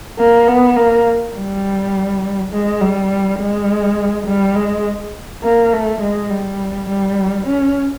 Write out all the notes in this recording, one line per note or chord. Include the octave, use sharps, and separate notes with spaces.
A#3
B3
A#3
G3
G#3
G3
G#3
G3
G#3
A#3
A3
G#3
G3
G3
C#4